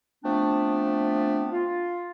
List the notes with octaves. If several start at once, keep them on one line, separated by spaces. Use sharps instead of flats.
F3 A3 B3 C4 D4
F4